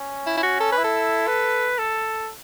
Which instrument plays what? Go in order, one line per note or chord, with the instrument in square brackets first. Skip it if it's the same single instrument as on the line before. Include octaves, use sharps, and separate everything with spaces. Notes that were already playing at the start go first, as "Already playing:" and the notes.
Already playing: [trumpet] C#4
[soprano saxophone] E4
E4
F#4
A4
B4
[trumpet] E4
[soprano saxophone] A4
[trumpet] B4
A4